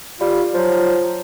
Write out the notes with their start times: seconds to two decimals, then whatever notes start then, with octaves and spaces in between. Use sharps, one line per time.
0.20 G3 F4
0.54 F3 F#3